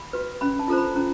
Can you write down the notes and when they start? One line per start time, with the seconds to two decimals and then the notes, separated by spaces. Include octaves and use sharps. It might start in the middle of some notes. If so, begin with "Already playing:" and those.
Already playing: B5
0.13 F#4 B4
0.41 C#4 B5
0.59 A5
0.68 F4 A4 C5 A#5
0.78 B5
0.96 C#4 A#5